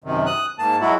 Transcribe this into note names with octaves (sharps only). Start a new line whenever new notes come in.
F#2 C3 D#3
D#6 F#6
G#2 A#3 A5
F#3 G#3 E4 F#4